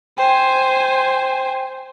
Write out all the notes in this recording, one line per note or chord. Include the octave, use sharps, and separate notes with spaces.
C5 G5 G#5